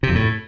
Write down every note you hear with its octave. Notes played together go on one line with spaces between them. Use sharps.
C3
F2
A2